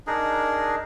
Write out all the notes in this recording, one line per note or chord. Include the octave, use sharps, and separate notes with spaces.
D4 D#4 G#4 A#4